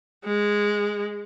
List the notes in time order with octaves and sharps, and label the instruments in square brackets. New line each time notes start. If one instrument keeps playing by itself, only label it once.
[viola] G#3